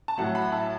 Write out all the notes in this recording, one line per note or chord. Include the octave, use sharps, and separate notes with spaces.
A5
A2 F#3 A3 F#5
F#5 B5
E5 A5